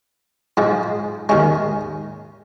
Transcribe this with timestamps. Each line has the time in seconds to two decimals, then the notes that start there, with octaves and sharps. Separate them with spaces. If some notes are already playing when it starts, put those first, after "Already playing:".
0.57 G#2 F3 G#3
1.29 D#2 D#3 G#3 C#4